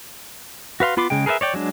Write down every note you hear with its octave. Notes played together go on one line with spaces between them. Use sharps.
F#4 B4 F5 C6
B3 F4 B5 C6 D6
C#3 G#3 G5
G#4 A#4 B4 C#5 E5
C#5 D5 G5
F#3 G#3 D4